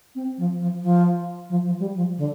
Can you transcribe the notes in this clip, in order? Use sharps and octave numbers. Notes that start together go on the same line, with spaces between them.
C4
F3
F3
F3
F3
F3
G3
F3
D3